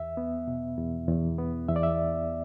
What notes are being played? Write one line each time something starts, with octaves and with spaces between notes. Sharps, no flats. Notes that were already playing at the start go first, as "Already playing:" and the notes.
Already playing: E2 E5
B3
B2
E2
E2
B3
E2 E5
D5
E5